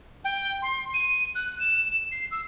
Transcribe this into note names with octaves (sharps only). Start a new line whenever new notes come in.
G5
C6
D#7
F#6
E7
C7
E6